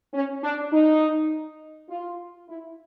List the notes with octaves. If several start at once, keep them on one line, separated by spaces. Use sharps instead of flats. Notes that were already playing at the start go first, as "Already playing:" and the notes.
C#4
D4
D#4
F4
E4